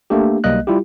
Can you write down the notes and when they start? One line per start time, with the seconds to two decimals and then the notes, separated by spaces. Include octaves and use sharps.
0.10 A3 A#3 D4 G4
0.44 B1 G3 A#3 D#5 F#6
0.67 G3 E4 F4 G4